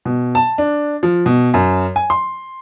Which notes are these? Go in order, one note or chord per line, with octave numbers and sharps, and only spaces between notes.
B2
A5
D4
F3
B2
F#2
G#5
C6